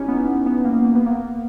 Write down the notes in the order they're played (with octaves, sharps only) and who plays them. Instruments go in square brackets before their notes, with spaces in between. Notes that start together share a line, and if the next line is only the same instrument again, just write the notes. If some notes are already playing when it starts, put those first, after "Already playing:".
Already playing: [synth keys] C#4 D#4 E4 G4
B3
B3
A#3
A#3
B3
A#3